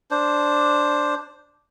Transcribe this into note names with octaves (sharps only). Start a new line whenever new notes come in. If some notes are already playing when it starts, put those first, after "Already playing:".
D4 C5